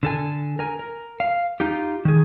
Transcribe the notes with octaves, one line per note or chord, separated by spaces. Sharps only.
D3 A4 G#5
A#4 G#5
A#4
F5
D#4 F4 G4
D#3 G#4